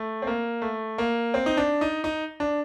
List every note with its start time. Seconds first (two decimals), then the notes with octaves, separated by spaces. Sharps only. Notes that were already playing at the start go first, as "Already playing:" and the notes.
Already playing: A3
0.22 C4
0.27 A#3
0.62 A3
0.98 A#3
1.34 C4
1.46 D#4
1.57 D4
1.81 D#4
2.04 D#4
2.40 D4